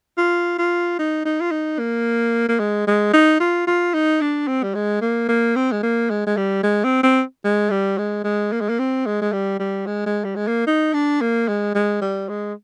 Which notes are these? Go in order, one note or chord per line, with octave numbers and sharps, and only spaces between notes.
F4
F4
D#4
D#4
F4
D#4
A#3
A#3
G#3
G#3
D#4
F4
F4
D#4
D4
C4
G3
G#3
A#3
A#3
C4
G#3
A#3
G#3
G#3
G3
G#3
C4
C4
G#3
G3
G#3
G#3
A#3
G#3
A#3
C4
G#3
G#3
G3
G3
G#3
G#3
G3
G#3
A#3
D#4
D4
A#3
G#3
G#3
G3
G#3